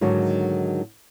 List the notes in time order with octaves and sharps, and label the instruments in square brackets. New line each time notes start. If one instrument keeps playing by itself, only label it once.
[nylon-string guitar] G#2 D3 D#3 F#3